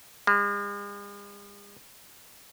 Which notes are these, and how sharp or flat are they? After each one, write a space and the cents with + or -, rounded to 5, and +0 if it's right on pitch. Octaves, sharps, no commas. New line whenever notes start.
G#3 -45